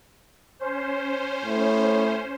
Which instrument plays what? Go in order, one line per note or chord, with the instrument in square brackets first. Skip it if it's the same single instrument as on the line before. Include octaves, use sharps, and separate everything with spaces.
[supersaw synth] C#4 C5
[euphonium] A2